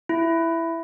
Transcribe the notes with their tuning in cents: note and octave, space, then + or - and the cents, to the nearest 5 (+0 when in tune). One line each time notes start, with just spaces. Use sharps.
E4 +10